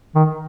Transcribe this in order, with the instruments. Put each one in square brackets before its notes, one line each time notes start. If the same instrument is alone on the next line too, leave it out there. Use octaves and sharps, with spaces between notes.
[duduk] D#3